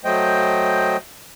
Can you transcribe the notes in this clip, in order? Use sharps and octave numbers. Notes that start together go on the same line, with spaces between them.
F#3 A3 C5 D#5 G5